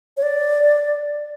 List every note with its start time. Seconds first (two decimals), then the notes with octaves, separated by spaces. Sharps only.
0.17 C#5
0.22 D5